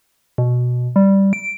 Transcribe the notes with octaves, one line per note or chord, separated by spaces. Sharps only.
B2
G3
D7